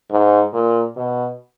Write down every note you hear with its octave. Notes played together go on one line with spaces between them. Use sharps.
G#2
A#2
B2